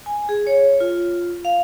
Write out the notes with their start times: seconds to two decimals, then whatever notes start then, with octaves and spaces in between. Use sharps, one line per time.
0.06 G#5
0.29 G#4
0.47 C#5
0.80 F4
1.45 F5